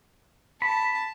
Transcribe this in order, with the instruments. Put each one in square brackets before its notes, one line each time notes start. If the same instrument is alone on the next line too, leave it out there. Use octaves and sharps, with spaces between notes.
[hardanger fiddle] A5 [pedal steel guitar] B5